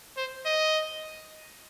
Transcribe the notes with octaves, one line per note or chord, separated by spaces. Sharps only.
C5
D#5